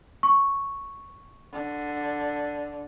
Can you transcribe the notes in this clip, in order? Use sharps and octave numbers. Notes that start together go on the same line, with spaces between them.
C#6
D3